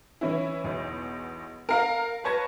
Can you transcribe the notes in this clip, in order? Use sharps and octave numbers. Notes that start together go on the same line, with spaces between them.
E3 C#4 E4
B1 E2
A#4 F5
B4 C#5 A5 G#6 A#6